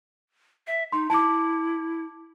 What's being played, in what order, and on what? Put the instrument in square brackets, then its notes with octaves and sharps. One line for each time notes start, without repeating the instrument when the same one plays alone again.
[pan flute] E5
[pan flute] D#4 [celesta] C6
[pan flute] E4 [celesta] A5 D6